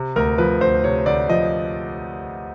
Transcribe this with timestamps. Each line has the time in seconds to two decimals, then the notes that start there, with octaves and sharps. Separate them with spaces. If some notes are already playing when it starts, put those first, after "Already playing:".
Already playing: C3
0.16 D2 A#4
0.38 F3 B4
0.61 D2 C5
0.84 C3 C#5
1.06 D2 D5
1.29 F3 D#5